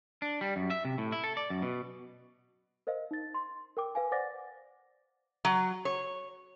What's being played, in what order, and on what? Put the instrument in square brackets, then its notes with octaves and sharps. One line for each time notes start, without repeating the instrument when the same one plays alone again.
[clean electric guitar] D4
G3
F#2
E5
C3
A2
E4
A4
D5
F#2
B2
[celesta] A#4 C5 D#5 F5
D#4 A6
C6
A#4 G5 D6
B4 F5 G#5
C5 D5 F#5 D6 A6 A#6
[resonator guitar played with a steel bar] F#3
C#5